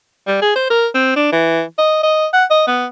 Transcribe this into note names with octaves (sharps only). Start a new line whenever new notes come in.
G3
G#4
C5
A#4
C4
D4
E3
D#5
D#5
F#5
D#5
B3